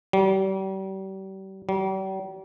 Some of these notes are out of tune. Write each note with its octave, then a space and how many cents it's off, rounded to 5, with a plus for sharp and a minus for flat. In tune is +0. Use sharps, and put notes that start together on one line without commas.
G3 -35
G3 -40